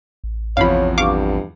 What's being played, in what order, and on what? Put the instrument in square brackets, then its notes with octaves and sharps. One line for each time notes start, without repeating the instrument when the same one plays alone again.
[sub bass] A1
[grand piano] E2 C3 F3 [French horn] C#5 [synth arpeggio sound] F5 B5
[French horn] G2 [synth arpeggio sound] F5 C#6 D6